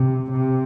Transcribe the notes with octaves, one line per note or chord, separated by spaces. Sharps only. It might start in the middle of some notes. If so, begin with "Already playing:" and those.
Already playing: C3
C3